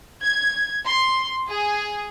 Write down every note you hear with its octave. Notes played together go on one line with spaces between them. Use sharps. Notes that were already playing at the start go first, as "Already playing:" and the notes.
G#6
C6
G#4